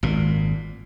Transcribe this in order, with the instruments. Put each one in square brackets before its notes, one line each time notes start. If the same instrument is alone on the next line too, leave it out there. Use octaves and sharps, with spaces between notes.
[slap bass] G#1 A#2